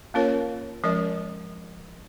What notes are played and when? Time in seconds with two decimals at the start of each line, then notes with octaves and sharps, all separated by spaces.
0.14 A#3 C#4 F4 A#4 C#5
0.84 F3 G#3 C#4 A#4 D#5